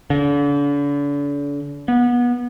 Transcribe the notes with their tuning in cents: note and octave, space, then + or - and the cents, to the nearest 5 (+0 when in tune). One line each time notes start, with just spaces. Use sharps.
D3 -40
B3 -25